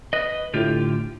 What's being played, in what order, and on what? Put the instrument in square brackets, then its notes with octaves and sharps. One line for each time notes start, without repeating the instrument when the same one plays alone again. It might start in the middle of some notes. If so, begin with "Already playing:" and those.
[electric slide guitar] B4 D#5
[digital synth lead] A2 [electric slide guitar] D3 F4 G4